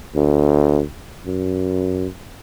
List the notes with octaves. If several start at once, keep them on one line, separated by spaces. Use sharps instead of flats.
D2
F#2